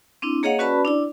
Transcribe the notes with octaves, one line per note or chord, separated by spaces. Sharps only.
C4 D4 E4
A#3 G#4 C#5 D#5 F5 F#5
C#4 F#4 B4 D5 A5 B5
D4 E4 D5